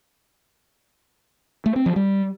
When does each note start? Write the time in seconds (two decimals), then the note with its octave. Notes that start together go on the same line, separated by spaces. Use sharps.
1.66 A3
1.76 C4
1.86 F3
1.96 G3